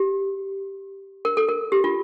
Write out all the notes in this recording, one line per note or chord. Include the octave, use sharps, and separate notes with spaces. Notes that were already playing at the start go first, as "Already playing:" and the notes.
Already playing: G4
A#4
A4
A#4
G4
F4